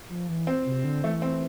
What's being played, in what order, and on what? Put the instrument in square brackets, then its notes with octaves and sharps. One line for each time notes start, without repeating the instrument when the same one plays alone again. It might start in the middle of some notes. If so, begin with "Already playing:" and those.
[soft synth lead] F3
E3
[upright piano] C4
[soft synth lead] C3
D3
[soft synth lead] E3 [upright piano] A3
[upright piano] C4